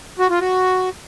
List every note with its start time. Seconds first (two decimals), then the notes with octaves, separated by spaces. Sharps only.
0.19 F#4
0.30 F4
0.40 F#4